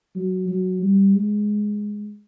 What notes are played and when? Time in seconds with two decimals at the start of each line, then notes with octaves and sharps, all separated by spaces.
0.15 F#3
0.48 F#3
0.82 G3
1.14 G#3